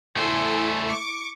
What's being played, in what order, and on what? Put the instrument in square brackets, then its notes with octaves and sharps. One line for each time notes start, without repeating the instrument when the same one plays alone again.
[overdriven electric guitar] A3 C5 [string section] E4 A4 G#5
[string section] C#6 D6